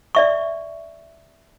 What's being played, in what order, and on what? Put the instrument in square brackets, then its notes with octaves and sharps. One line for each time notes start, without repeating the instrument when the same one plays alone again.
[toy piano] D5 E5 C#6